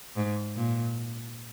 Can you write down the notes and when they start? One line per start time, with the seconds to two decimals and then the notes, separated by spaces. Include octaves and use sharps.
0.17 G#2
0.56 A#2